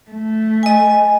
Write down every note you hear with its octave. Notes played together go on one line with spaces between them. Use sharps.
A3
D#5 G#5